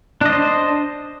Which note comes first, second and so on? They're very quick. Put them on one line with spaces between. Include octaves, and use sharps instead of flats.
D4 D#5 C5